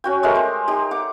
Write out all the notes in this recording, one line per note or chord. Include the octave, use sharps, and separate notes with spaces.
C#4 F#4 G5
G#3 A3 G4 A#4
C5
D#4 G4
F#5 D6